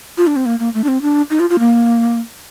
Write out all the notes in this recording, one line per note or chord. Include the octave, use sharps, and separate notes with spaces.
F4
D4
C4
A#3
A#3
A3
D4
C4
D4
D#4
F4
F4
A#3